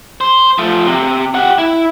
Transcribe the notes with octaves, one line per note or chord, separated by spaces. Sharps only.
C5
F3 A3
C3
G4 F#5
E4